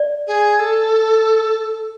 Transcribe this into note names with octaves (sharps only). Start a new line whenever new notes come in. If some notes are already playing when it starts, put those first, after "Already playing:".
Already playing: D5
G#4
A4